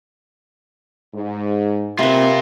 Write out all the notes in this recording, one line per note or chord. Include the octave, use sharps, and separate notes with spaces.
G#2
C3 A#3 C4 F4 B4